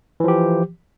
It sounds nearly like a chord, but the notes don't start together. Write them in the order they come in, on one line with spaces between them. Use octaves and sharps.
E3 F3 G4